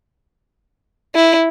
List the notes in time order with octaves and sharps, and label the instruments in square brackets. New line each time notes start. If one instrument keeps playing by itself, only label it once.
[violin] E4